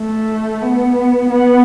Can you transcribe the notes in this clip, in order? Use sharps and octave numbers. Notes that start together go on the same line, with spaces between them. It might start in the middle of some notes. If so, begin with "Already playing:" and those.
Already playing: A3
B3
B3